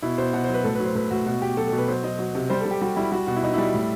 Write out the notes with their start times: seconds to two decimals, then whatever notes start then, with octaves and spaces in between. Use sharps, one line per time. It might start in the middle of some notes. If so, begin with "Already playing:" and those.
0.02 B2 E4
0.18 B2 C5
0.33 B2 F#5
0.44 C5
0.49 F#3
0.54 B4
0.64 A2 A4
0.75 B4
0.80 F#3 C5
0.95 A2 B4
1.11 A2 F#4
1.26 B2 F#4
1.42 B2 G4
1.57 F#3 A4
1.68 A4
1.72 B2
1.78 B4
1.88 F#3 C5
2.04 F#3 D#5
2.19 F#3
2.35 C3
2.50 G3 C5
2.61 A4
2.65 G3
2.71 G4
2.81 G3 F#4
2.96 G3 E4
3.12 G3 F#4
3.27 B2 F#4
3.36 E4
3.43 B2 D#4
3.54 G3 E4
3.74 A2